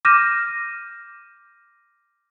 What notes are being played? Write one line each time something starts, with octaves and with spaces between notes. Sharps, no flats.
D6 F6 G6 A#6 D#7 E7